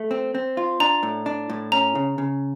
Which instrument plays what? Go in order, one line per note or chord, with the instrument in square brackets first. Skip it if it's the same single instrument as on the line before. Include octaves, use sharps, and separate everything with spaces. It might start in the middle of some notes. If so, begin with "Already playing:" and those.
Already playing: [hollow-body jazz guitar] A3
C4
C4
F4
[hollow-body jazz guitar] D4 [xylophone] A#5
[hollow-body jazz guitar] A2
D4
A2
[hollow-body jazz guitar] C#4 [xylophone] A#5
[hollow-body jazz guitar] C#3
C#3